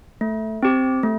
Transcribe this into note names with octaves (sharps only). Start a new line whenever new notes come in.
A3
C4 G4
A3